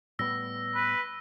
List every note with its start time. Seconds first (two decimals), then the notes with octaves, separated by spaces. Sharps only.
0.19 A2 G3 B3 E6 A#6
0.75 B4